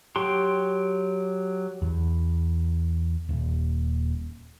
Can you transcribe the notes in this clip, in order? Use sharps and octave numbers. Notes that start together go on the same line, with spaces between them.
F#3 G4 C6
E2
D#1